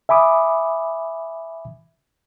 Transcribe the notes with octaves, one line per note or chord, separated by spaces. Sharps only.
E5 G#5 B5 D6 D#6